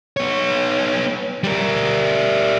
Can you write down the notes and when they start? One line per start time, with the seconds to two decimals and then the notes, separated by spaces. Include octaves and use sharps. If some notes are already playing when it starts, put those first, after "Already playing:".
0.17 B3 C#5
1.43 G3 A#4